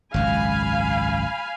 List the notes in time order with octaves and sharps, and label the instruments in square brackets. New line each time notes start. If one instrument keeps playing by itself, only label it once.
[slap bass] G#1 C#2 F#2 [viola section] F5 G#5 B5